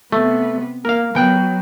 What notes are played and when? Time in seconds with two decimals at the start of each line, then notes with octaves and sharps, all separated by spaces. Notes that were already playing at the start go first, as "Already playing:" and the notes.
0.12 C3 A3 B3
0.85 A#3 A#4 F5
1.15 F#3 B3 G5 F#6